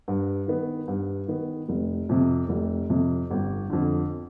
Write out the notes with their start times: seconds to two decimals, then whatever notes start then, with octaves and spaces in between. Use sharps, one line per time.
0.08 G2
0.48 D#3 B3
0.88 G2
1.28 D#3 B3
1.69 F1
2.09 F2 C3
2.49 F1
2.90 F2 C3
3.31 G1
3.70 F2 D3